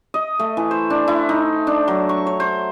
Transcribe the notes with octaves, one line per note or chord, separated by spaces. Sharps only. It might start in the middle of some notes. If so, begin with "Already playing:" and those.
D#5
A3
E3
C5
D4
E4
D#4
D4
F#3
C#6
C#5
C5